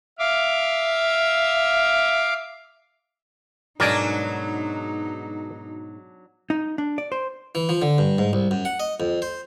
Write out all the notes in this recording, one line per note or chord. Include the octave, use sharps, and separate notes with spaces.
E5 F5 D6
G#2 B2 F#3 D4 D#4 A#4 D5 G#5
D#4
D4
D5
C5
E3
F3
D3
G2
G#2
C2
F#2
F#5
D#5
F2
C5